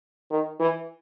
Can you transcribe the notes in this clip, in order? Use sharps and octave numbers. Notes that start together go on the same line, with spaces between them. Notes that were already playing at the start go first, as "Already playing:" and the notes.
D#3
E3